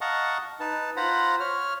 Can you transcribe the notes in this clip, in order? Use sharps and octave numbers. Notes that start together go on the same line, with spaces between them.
D#5 F5 F#5 A5 A#5 C#6
D#4 B4 A5
F4 C5 F#5 A#5 B5
C#5 F6